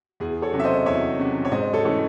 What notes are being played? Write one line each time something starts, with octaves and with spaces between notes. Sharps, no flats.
E2 G#4
A4 C#5
C3 F#3 C#4
E5
C5 D#5
E2 C#5 E5
C3 F#3 C#4
C#5
G#2 C5 D#5
A4 C#5
E3 A3 C#4 C#5